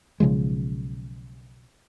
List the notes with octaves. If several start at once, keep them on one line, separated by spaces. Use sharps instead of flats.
B1 C#3 F3 G#3